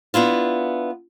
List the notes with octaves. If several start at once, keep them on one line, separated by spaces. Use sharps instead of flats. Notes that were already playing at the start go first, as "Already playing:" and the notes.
B3 D4 E4 F4